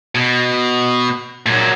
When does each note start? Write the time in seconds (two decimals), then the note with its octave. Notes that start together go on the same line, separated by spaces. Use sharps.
0.15 B2
1.46 A#2 F#3